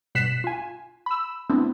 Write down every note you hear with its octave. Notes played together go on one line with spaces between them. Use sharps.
G2 B2 F#6 B6 C7 E7
F4 G#5
B5 E6
A3 B3 C4 D4 E4